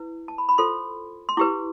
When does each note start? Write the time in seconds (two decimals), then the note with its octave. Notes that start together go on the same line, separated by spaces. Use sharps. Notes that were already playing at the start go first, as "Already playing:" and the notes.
Already playing: E4 B4
0.28 A5
0.38 B5
0.49 B5
0.58 F4 A4 C5 C6
1.29 C6
1.37 E4 G4 B4 D6